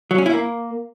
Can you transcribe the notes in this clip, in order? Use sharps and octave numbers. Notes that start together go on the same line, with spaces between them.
F#3
C#4
E4
A#3